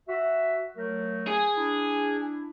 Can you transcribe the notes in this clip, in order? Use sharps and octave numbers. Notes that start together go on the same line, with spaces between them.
F#4 E5
F#3 A3 A#4
G#4
D4 E4